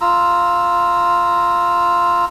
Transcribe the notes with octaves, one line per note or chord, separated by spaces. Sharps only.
F4 A#5 E6